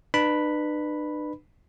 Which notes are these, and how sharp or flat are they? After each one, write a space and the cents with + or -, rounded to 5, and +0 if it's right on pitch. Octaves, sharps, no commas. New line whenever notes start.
D4 +45 B4 +0 B5 +0